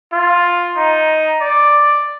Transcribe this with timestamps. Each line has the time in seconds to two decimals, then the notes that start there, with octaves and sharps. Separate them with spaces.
0.13 F4
0.77 D#4
1.41 D5